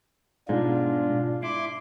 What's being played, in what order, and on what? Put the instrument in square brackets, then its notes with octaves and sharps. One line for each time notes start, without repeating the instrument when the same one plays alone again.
[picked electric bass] G#2 [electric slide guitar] B2 G#3 [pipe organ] D4 F4
[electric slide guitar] E4 [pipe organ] C6 D6